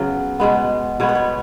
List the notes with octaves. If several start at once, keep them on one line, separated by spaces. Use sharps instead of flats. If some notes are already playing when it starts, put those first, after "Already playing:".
Already playing: C#3 F#3 B3
B2 G#3 B3
B2 G#3 B3 C#5
B4
C#5